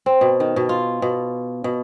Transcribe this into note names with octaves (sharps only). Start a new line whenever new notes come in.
C4
B2
D#3
B2
F4
B2
B2